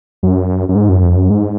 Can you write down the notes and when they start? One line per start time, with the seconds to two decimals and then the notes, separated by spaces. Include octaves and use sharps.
0.23 F#2
0.69 F#2
0.75 G#2
0.89 F#2
1.03 F2
1.15 F#2
1.30 G#2